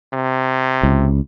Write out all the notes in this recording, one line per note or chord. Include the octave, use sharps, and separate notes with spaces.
C3
C#2